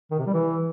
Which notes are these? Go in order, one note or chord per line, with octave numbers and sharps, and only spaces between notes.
D#3
C3
G3
E3